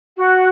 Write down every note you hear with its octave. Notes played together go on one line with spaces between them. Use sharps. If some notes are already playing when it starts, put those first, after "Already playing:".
F#4